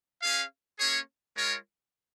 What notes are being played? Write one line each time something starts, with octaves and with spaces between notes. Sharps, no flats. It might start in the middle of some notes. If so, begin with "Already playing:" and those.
C#4 G#4 F5
A#3 C#4 G#4 C#5
G#3 F4 A#4 C#5